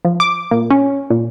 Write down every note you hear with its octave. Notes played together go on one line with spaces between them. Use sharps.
F3
D6
A#2
C#4
A#2